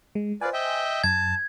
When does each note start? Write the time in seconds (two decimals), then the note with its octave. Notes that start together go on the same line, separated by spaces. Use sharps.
0.15 G#3
0.41 F4 B4 C5 D5 G#5
0.53 D#5 E5 G5
1.04 F#2 A5 G#6